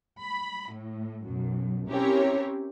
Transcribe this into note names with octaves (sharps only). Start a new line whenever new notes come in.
B5
A2
B1 F#2
C4 C#4 E4 G4 A#4 C#5